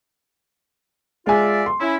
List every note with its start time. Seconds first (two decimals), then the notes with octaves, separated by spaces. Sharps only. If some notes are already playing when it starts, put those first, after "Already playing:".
1.27 G#3 F4 D5 E5 G#5
1.66 C6
1.80 C#4 E4